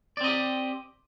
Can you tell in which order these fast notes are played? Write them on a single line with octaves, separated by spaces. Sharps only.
D5 C4 D#5 G4